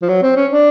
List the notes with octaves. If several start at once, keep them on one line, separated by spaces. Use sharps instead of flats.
F3
F#3
C4
C#4
D4